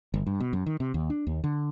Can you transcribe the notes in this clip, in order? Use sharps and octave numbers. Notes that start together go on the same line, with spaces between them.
G1
G2
B2
F#2
D#3
C3
D#2
D4
D#2
D3